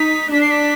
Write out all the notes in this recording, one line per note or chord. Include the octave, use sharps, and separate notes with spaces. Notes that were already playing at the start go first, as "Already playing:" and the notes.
Already playing: D#4 B6
D4 B6
C7
B6